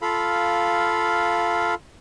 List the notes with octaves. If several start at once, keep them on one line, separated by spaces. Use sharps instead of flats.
F4 A4 F5 B5